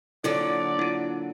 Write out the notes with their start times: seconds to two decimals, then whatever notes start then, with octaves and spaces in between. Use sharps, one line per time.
0.24 A#2 D3 F#3 E4 D5
0.79 E4 F4